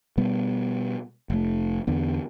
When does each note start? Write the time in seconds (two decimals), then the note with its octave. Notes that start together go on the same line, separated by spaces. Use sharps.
0.17 B2 G3 B3
1.30 F1 A3
1.87 E2 D3 B3